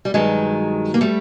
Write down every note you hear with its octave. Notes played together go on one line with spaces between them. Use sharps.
G3
G2 D#3 F#3 G#3
A#3
G3 A3